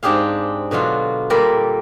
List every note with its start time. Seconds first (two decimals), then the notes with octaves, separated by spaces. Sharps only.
0.03 G#2 C4 D4 G4 G#4 F5
0.71 B2 D3 F#3 F4
1.30 A#2 G3 A4 A#4 D5 B5